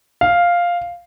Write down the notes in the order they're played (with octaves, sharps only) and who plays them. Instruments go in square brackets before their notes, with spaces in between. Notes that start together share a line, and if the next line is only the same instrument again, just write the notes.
[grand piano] F5